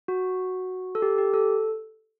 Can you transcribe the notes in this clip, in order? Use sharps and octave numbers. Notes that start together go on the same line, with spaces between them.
F#4
A4
G4
G4
A4